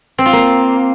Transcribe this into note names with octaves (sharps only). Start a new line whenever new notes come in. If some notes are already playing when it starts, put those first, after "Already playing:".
C4
F4
A#3